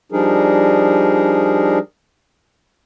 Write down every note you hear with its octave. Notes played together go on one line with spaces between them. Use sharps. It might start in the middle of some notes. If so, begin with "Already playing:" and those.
F3 G3 D4 D#4 G#4 A#4